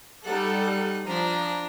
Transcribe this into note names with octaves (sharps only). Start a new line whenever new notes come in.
G3 D#4 A4 F#5
F3 D4 A#5